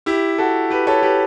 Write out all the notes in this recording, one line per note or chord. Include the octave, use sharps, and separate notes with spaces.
E4 G4
F#4 A4
G4 B4
A4 C#5
G4 B4